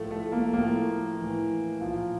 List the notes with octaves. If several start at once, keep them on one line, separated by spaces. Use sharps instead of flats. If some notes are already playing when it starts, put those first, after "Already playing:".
Already playing: A2 F3 A3
A3
A#3
A2 F3 A#3
A2 E3
A#2 F3